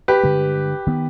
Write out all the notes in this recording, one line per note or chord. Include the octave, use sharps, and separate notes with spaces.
G4 B4
G2 D3 G#3
D#3 B3